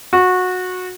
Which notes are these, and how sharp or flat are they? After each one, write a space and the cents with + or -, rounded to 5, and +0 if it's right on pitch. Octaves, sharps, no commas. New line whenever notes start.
F#4 -20